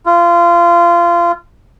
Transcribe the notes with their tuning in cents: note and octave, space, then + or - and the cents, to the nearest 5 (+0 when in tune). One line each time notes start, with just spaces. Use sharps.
F4 -25